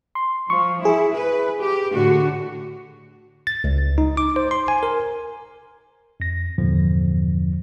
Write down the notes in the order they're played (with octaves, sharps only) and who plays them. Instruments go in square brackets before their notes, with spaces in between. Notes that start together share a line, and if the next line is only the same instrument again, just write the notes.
[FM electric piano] C6
[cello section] F3 [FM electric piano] C#6
[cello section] E4 [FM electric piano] G#4
[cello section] B4
G4
A2 D3 F#4
[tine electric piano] A6
C#2
D#4
D6
C5
C6
G#5
A#4
F2 A#6
E2 G2 A#2 D3 F3